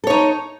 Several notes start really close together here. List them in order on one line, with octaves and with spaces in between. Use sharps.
A4 C#5 D#4